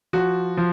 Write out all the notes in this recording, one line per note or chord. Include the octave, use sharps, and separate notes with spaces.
F3 F#4
F3